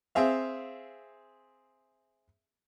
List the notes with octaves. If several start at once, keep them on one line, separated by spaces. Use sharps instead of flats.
C4 G#4 E5 F5